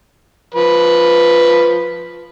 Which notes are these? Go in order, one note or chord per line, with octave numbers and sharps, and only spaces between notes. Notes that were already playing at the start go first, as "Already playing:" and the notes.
F3 B4